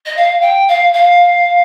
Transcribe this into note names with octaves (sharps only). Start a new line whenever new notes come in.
D#5
F5
G5
F5
F5